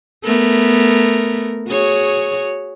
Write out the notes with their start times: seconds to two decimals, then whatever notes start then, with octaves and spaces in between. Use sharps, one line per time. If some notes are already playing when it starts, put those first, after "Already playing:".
0.24 A3 B3 A#4
1.68 F#4 G#4 C#5